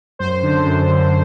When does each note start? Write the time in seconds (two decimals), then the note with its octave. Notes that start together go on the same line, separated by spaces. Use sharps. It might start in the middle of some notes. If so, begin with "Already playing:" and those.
0.19 F#2 C5
0.43 D3
0.66 F#2
0.90 D3